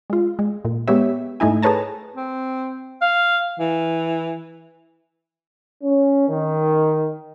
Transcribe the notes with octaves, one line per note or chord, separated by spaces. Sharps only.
G#3 F4
G#3
A#2
G#3 B3 G4 C#5 E5
G#2 A3 D#4 E4 G#5
G#4 A4 B4 C#5 A5 A#5
C4
F5
E3
C#4
D#3